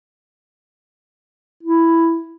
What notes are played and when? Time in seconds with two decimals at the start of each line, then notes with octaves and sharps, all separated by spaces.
1.63 E4